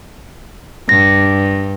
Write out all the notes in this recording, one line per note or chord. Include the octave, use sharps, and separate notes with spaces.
G2 A#6